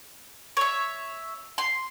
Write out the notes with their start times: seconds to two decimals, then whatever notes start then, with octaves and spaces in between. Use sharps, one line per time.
0.57 C#5 E5
1.58 C6